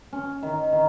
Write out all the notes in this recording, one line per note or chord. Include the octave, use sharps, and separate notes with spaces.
C#4
D#3
D#3